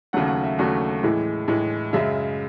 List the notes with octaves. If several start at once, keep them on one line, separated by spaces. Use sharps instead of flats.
D#2 C#3 F#3 A3 F#5
F#5
E5
D#2 C#3 F#3 A3 F#4
A2 E3 G#3
A2 E3 G#3
F#2 C#3 G#3 E5